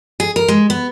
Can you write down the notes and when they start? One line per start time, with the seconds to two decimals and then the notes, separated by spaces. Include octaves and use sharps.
0.20 G#4
0.36 A#4
0.48 G#3
0.70 B3